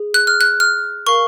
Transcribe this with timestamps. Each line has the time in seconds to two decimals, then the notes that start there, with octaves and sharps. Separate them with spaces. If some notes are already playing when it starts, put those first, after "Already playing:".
Already playing: G#4
0.14 F#6
0.27 F6
0.41 F#6
0.60 F6
1.07 A#4 F5 C#6